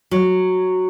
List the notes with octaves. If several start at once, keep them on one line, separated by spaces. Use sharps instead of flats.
F#3